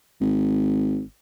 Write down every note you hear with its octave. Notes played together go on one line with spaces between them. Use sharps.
G#1